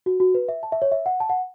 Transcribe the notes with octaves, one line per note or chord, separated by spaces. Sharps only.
F#4
F#4
B4
E5
A5
E5
C#5
E5
F#5
A5
F#5